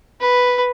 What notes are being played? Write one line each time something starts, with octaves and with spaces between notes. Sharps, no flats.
B4